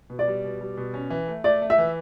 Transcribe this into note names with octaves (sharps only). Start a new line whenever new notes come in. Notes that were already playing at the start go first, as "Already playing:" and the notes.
B2
D5
G3
B2
G3
B2
C#4
E3
A3
A3 D5
A3
E5
E3